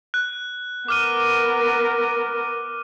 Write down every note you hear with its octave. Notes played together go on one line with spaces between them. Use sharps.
F#6
B3 A#4 D6 F6 D#7